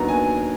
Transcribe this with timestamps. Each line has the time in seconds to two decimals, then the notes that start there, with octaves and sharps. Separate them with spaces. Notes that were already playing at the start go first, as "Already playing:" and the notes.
Already playing: D#2 D#3 F#3 B3 D4 A#5
0.08 G#5